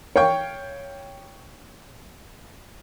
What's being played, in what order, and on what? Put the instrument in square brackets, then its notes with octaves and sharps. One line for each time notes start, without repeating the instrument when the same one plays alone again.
[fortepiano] C#5 F5 G5 C#6